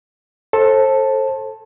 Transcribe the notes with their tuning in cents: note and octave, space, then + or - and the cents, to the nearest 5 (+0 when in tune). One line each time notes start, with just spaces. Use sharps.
A4 +0 C5 +30